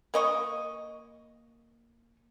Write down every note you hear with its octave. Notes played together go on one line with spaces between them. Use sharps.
A#3 D#5 C#6